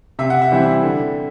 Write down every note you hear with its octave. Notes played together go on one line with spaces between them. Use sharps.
C3 E5
F#5
E5
E3 G3 C4 E4
D3